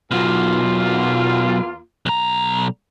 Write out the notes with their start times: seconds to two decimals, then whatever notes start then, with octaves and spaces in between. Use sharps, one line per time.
0.11 E2 B2 F#3 A#3 F4
2.06 B1 A#5